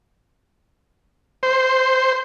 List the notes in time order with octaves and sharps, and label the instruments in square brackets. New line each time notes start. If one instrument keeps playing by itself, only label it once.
[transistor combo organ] C5